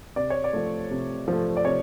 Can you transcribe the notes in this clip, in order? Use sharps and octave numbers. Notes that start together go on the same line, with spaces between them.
C3 D5
C#5
D5
F3 A3
C3
F3 A3
D5
C3 C#5